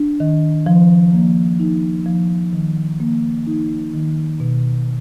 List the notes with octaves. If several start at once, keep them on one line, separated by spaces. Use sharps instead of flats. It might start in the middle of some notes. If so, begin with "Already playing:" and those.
Already playing: D4
D#3
F3
A#3
D#4
F3
D#3
A#3
D#4
D#3
B2